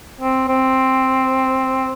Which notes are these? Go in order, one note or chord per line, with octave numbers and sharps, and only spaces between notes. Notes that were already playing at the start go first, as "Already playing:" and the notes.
C4
C4